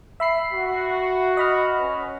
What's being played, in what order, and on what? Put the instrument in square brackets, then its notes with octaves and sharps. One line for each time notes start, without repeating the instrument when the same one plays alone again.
[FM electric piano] E5 B5 C7
[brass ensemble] F#4
[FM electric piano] D#5 B5 F6
[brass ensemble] C#4 B4